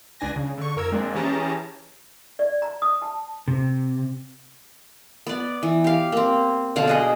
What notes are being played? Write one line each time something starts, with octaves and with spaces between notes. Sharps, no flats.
C#2 D4 G#5 A#6
C#3
D3 C#6
F2 A#4 E6 G#6
G#3 A#3 C4 D4
E3 C#4 G4 G#4 A5 A#5
D5
A#5
D#6
A5
C3
B3 D5
E3
G4 F5
A#3 C4
B2 D3 F5 F#5
G#4 D#5 F#5